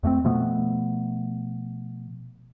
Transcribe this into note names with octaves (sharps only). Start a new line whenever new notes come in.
F2 A3 A#3 C4
B2 F3 A3 B3